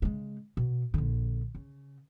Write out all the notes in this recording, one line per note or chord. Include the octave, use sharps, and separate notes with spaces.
C#3 G#3
B2
A#1 D3
C#3